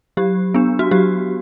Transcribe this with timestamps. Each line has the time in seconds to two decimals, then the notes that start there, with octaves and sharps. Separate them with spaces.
0.17 F#3 G4
0.54 B3 D4
0.79 F#4
0.91 F#3 G4